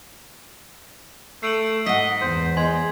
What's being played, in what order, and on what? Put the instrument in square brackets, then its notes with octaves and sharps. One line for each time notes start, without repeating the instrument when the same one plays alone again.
[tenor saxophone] A3 [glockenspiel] C7 D7 F#7
[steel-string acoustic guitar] G#2 F#5 [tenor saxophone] D#5 [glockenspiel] B6
[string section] E2 [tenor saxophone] C5
[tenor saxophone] G#3 [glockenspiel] G#5 C6 G#6